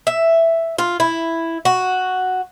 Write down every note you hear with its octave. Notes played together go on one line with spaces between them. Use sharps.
E5
F4
E4
F#4